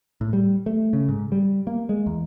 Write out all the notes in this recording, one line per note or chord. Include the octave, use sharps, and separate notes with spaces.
A2
G3
A3
C#3
G#2
G3
A#3
G#3
E2